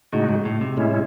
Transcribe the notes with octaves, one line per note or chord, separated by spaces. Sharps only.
A2 C#3 G#3 D#4 F#4
G#2
A2
C3
A2 G#3 C#4 E4